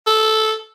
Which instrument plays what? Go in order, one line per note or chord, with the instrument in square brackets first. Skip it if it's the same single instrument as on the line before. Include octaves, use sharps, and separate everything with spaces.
[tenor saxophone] A4